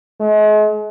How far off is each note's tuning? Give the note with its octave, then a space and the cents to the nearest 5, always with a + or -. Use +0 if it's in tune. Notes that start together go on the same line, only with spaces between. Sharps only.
G#3 +40